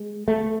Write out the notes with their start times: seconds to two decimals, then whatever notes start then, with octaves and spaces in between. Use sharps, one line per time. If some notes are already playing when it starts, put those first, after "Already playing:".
Already playing: G#3
0.28 A3